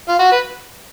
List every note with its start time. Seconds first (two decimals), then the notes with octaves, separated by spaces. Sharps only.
0.08 F4
0.19 F#4
0.32 B4